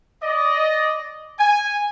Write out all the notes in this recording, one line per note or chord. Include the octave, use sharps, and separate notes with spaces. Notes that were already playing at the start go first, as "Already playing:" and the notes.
D5 D#5
G#5